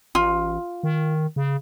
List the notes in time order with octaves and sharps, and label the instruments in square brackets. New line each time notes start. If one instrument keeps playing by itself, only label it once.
[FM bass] A1 [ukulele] F4
[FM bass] D#3
C#3